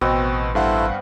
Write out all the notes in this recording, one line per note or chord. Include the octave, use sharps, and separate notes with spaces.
A1 B2 B3 C4 D#5 C#6
G2 E4 A4 C5 F5 F#5